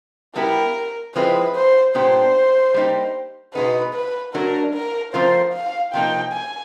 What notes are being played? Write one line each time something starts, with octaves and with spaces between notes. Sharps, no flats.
G3 B3 E4 G4 A#4
F3 G#3 C4 E4 G#4 B4
C5
A#2 G3 B3 D4 G4 C5
G3 A#3 D#4 G4
B2 G#3 B3 D#4 B4
B4
F#3 A3 D4 F#4 A#4
A#4
F3 A3 C4 F4 A#4 C5
F5
C3 F3 A#3 D#4 G5
G#5